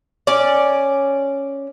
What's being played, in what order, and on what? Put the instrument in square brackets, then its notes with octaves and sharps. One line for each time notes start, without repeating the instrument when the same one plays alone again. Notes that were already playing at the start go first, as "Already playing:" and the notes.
[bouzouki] C#4 D5